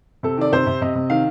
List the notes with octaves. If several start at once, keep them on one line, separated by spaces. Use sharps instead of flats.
C3 A4
D#3 D5
C3 C5
C3
C3 D#5
C3
D#3 F5